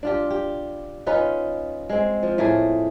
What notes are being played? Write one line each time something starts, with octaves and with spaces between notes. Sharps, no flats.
D4 F4 G4
G4
C#4 D#4 F4 B4
G#3 C4
F3
A2 A3 A#3 G#4